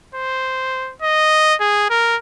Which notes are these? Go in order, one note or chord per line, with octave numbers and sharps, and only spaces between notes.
C5
D#5
G#4
A#4